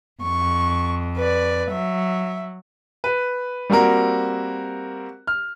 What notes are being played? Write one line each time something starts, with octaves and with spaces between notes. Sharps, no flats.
F2 C#6
B4 D5
F#3 E5
B4
G3 A#3 C4 F#4 A#4
F6